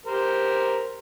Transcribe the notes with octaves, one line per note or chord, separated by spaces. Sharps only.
G4 A#4 C5